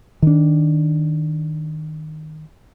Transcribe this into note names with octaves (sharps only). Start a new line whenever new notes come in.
D#3 D4